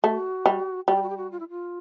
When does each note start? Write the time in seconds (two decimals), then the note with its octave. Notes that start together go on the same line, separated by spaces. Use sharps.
0.04 A3 F#4
0.46 G3
0.88 G3 F#4
0.95 G4
1.03 F#4
1.10 G4
1.17 F#4
1.32 F4
1.40 E4
1.49 F4